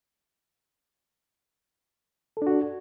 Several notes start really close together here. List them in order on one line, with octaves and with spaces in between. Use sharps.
A4 D4 F#4